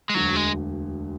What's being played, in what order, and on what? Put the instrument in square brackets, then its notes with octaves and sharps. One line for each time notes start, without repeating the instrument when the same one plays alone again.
[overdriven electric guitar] G#3
[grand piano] E1 D2 D3 [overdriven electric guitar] F#3
[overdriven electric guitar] G#3